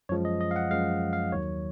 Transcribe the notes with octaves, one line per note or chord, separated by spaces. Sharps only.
F#2 F3 G#3 C#5
D#5
D#5
F5
F#5
F#2 F3 G#3 F5
F5
D#2 D#3 F#3 C#5